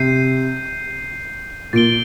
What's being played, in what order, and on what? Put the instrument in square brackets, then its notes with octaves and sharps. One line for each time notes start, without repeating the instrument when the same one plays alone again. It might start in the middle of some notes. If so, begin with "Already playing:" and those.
Already playing: [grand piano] C3 [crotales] G6 C7 D#7
[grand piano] A#2 [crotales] A6
[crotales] D7 G7